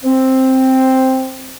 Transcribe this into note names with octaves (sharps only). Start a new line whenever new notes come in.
C4